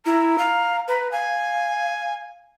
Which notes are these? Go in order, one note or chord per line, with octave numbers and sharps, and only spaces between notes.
E4 A#5
F5
B4 A#5
F5 G#5